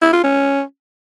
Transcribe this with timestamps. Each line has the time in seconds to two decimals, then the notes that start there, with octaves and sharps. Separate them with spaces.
0.02 E4
0.13 F4
0.24 C#4